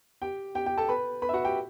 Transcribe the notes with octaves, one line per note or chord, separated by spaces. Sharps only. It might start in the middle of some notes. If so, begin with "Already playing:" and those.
G4 G5
G4 G5
G4 G5
A4 A5
B4 B5
B4 B5
E5
F#4 F#5
G4 G5